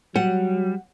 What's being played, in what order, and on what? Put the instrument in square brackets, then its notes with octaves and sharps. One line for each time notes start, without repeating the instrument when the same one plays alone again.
[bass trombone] F#3 [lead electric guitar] G3 [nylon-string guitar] F#5